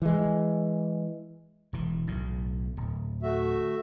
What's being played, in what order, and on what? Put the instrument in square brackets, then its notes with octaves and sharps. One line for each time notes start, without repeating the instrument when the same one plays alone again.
[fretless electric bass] E3 G#3
[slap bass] E1 E3
B1 A2
D1
[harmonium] A3 F#4 E5